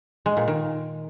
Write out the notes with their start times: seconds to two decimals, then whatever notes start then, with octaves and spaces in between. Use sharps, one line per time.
0.26 G#3
0.37 A#2
0.48 D#3